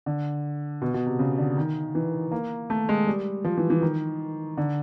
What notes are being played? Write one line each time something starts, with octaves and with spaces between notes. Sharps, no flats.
D3
B2
B2
C3
C#3
D3
D#3
E3
A#3
A3
G#3
G3
F3
E3
E3
D#3
D3